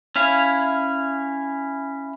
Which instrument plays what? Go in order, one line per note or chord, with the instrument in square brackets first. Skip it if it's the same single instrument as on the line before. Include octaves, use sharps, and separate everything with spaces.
[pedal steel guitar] C#4 E4 F5